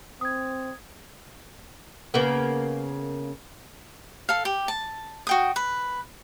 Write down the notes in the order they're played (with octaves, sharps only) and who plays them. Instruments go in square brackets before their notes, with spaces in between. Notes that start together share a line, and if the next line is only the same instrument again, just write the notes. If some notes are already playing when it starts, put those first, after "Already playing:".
[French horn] C4 [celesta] D#6 G#6
[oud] C#3 A#3 B3
[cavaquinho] A4 F5
G4
A5
F#4 G5 D#6
B4